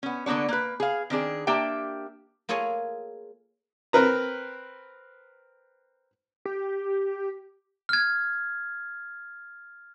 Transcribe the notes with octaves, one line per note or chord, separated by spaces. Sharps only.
B3 C#4
D3 A#3 B3 D4 C#5
A#3 B4
G#4 F5
D#3 C4 D4 G#4
A#3 D4 G4 E5 G5
A#3 F4 G#4 A4 C#5 G#5
C4 A#4 B4 A#5
G4
F6 G#6